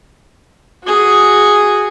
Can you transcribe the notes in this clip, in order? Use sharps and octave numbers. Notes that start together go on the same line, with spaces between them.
F#4 G#4